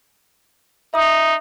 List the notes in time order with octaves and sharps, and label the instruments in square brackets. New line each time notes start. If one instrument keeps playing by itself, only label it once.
[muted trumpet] D#4 [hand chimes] E5 D#6